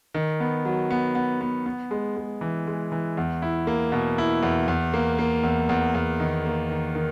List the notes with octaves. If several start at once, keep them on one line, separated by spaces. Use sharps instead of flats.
D#3
B3
F#3
B3
B3
B3
B3
G#3
G#3
E3
G#3
E3
E2
E4
A#3
B2
E4
E2
E2
A#3
A#3
E2
E2
E2
D#3
A#3
D#3
D#3